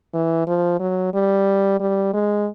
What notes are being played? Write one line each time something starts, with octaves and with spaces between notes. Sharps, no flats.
E3
F3
F#3
G3
G3
G#3